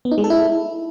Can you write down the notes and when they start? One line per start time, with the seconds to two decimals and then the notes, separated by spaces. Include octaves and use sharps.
0.05 B3
0.11 D#4
0.18 G#3
0.24 A4
0.30 E4